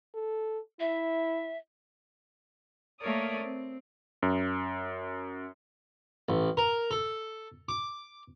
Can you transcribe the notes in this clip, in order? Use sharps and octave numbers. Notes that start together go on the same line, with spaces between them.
A4
E4 E5
A3 A#3 A#4 C#5 D5 D#6
C4
F#2
A1
A#4
A4
D6